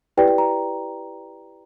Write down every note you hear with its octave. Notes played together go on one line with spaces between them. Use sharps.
E4 G4 B4 D5 G5
G5
A#5